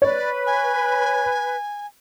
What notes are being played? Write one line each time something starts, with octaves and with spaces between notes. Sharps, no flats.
B4 C#5 D5
G#5